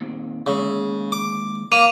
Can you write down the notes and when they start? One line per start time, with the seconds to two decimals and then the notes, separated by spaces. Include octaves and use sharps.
0.01 A#2 D#3 C4
0.46 D#2 C#3 G#3 E5
1.12 D6
1.72 A#3 F5 D6 D#7 F7